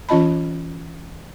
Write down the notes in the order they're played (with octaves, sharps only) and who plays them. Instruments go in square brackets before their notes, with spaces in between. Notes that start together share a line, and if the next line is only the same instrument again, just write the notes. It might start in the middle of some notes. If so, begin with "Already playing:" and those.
[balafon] E3 C#4 F4 D#5 A5 B5